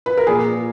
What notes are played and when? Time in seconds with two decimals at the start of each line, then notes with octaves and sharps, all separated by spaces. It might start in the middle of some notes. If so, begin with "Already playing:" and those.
0.06 B4
0.18 A#4
0.27 A#2 G#4